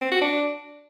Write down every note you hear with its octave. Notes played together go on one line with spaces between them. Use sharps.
C4
F#4
D4